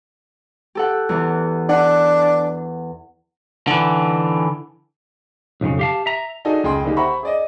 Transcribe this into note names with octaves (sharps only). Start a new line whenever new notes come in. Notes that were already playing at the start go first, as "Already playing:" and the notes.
G4 A4 F#5
E2 E3
D4 F#5
D3 E3
B1 F2 A#2 C#3
G4 F5 A5
E5 A#5
D4 D#4 F#4 G#4 A4 D#5
C#2 G#4 G5 C6
D3 A#3 D#4 G4 G#4
C5 E5 F#5 A#5 B5 C#6
G#4 D5 D#5